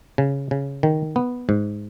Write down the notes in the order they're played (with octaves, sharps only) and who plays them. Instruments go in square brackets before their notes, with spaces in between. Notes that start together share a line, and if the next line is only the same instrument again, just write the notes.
[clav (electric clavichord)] C#3
C#3
D#3
B3
G#2